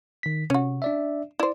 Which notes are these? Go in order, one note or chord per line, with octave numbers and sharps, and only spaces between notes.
D#3 B6
C3 C#4 F#4
D4 D5 E5
E4 C5 D5